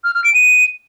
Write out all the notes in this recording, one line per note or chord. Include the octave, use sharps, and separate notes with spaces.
F6
F6
D7
D#7